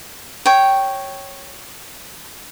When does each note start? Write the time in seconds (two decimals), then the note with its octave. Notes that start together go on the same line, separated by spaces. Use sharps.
0.46 C#5 G5